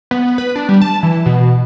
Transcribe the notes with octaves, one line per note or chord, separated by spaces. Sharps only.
B3
B4
D4
G3
A5
E3
B2